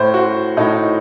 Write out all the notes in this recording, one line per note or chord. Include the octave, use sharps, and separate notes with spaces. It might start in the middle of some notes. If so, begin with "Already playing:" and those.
Already playing: A2 C5
F#4
A2 D#4